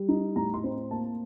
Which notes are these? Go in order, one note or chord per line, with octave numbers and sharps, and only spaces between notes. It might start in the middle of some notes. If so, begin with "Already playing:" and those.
Already playing: G3
D#4
A2 A#5
C6
C4
A#3 A5